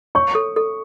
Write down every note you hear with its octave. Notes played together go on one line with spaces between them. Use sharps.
C#5 C#6
A4
A4